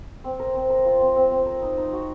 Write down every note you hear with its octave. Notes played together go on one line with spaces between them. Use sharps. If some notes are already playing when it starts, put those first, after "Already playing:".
C4
A#4
C4
A#4
F4
C4
C4
C4
A#4
D#4
D#4
F#4